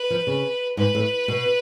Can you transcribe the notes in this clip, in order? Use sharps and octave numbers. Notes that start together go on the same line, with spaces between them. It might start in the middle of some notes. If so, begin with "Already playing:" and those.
Already playing: B4
F3
C#3
G#2 B4
A2
B2